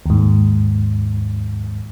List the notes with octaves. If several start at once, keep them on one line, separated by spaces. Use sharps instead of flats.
D#2 G#2